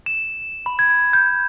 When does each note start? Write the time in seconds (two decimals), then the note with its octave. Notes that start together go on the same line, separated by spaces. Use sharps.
0.06 E7
0.66 B5
0.79 G#6
1.13 G6